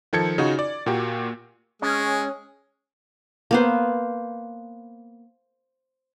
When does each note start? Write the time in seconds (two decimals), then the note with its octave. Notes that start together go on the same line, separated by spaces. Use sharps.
0.13 D#3 F3 A4 G#6 C#7
0.38 C#3 D#4 F4 F#4
0.59 D5
0.86 A#2 A#3 F#4 G4
1.82 G#3 C#4 G#4
3.51 A#3 B3 C5